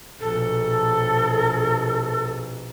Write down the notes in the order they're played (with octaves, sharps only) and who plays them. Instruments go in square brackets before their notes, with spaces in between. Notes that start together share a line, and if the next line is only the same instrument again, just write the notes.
[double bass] A#1 B2 [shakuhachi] A4